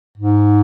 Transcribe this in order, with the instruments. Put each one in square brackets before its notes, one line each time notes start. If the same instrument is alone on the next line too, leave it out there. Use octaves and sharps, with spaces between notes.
[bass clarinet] G#2